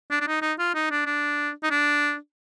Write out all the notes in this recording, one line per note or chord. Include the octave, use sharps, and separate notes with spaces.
D4
D4
D#4
D#4
F4
D#4
D4
D4
D#4
D4